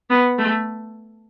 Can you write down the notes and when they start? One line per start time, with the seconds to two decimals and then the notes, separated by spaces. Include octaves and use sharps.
0.10 B3
0.38 A3